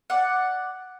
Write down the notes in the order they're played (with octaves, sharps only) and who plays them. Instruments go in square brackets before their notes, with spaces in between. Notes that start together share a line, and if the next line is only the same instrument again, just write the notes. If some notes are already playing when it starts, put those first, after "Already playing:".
[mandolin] D5 F#5